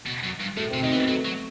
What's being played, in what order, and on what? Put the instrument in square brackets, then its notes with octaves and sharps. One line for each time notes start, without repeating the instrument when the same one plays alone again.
[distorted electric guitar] B2
F#2
G2
[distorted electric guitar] A2 [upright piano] A3
[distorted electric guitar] C3 [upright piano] C4
[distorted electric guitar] D#3 [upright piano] D#4
[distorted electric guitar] E3
[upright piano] B3
[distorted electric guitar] F#3 [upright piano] A3
[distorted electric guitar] F#3